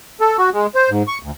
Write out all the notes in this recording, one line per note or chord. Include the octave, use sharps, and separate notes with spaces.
A4
F#4
G#3
C5
G#2
C#6
D2